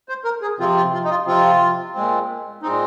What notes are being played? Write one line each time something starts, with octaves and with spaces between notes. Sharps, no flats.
C5
A#4
G#4
C3 F3 C4 F4
F4
F4
D#4
F4
C3 F3 C4 F4
A#2 G#3 C4
A#2 G#3 C4 D#4